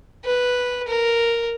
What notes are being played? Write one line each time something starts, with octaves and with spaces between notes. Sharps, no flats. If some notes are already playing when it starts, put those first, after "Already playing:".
B4
A#4